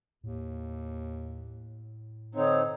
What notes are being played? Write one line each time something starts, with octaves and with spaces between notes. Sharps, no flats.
D#2 A2
D3 C4 D#4 C#5